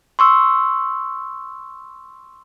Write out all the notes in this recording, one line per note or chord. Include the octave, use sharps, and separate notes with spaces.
C6 C#6 E6